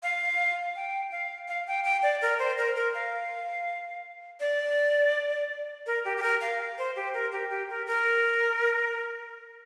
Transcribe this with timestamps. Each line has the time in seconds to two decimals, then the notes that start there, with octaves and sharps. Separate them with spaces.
0.03 F5
0.76 G5
1.11 F5
1.48 F5
1.67 G5
1.84 G5
2.03 D5
2.22 A#4
2.39 C5
2.58 A#4
2.76 A#4
2.94 F5
4.40 D5
5.87 A#4
6.05 G4
6.17 G4
6.22 A#4
6.41 F5
6.78 C5
6.96 G4
7.14 A#4
7.32 G4
7.50 G4
7.70 A#4
7.87 A#4